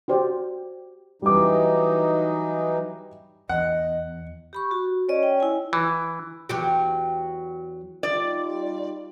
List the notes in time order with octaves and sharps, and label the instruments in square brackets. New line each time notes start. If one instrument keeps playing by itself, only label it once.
[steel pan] F#4 G4 C5 D5
[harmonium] E3 F#3 D#4 [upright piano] G3 D6
[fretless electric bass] E2 [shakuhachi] D#5 [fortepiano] F#5
[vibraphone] G4 B5 C#6
F#4
[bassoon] C#4 [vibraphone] D5 D#5
[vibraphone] G5
E4 G#5
[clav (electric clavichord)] E3
[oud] E2 F#3 G4
[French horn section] G3 D#4 F4 [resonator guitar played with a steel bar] D5